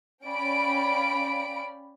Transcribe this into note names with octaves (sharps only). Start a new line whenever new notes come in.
C#4 D5 F5 G5 B5 D7